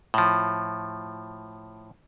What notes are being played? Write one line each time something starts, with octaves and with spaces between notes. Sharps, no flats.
A2 F3